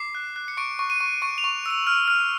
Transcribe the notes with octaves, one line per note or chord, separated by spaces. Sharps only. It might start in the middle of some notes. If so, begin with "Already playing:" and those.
Already playing: D6 C7
F#6
F#6
C#7
C#6 D7
C#6
D#7
C#6
C#6 D7
F7
C#6
E6 F7
F6
F6